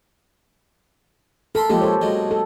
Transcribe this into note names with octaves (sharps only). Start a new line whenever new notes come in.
A4 A#4 B5 C6
F3 G#3 A#3 G4 A4
A4 C5 C#5
B1 F#2 G#3
A4